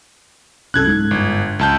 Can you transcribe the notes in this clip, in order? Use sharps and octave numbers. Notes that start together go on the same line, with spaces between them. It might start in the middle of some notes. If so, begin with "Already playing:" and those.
C2 F#2 A4 F#6 G#6
G#2
G1
C#2 A5 G6